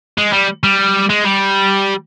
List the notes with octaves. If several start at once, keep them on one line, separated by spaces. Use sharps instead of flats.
G#3
G3
G3
G#3
G3